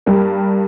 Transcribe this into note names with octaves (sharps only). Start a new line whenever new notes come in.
G2 G3 A#3